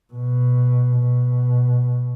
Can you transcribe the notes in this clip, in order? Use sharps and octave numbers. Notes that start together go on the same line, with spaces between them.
B2
B2